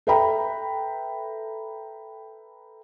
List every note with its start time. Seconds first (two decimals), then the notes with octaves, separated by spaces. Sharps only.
0.07 A4 B4 E5 G5 A#5 B5